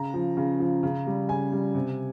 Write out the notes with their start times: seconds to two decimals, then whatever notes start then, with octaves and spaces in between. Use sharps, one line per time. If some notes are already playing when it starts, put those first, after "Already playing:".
Already playing: C#3 A#5
0.14 F3
0.37 C#3
0.60 F3
0.83 C#3
1.07 G3
1.29 C#3 G#5
1.52 G3
1.75 C3